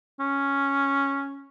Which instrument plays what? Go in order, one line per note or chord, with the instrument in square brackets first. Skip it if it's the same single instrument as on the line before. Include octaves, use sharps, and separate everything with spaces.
[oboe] C#4